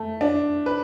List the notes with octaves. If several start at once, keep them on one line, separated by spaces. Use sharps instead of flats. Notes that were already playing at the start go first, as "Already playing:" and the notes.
Already playing: A3
D4
B4